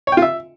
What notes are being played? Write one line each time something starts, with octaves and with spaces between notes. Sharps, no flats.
C#5
G5
F4
E5